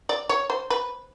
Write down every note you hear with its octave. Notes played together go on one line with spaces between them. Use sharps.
D5
C#5
C5
B4